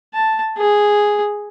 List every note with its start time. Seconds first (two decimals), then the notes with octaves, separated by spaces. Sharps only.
0.14 A5
0.58 G#4